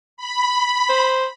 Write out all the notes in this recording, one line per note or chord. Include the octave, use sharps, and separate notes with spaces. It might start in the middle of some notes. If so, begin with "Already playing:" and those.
B5
C5